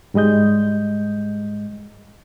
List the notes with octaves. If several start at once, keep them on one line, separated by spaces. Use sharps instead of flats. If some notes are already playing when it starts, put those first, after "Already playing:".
G#2 G3 G#3 D#5 G6